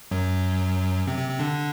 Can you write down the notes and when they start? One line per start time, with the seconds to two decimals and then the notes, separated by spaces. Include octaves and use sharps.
0.11 F#2 F#3
1.07 C3 C4
1.18 C3 C4
1.29 C3 C4
1.39 D3 D4